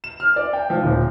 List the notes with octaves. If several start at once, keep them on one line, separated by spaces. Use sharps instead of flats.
E7
F6
D5
G5
F3
D#1